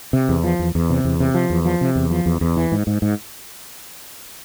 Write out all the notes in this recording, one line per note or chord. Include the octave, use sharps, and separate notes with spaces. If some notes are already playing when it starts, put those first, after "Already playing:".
C3
E2
F3
E2
E2
C3
E2
C3
F3
E2
F3
C3
E2
F3
E2
E2
E3
G#2
G#2
G#2